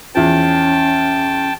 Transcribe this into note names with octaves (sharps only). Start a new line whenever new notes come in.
E2 F3 C#4 G5 A5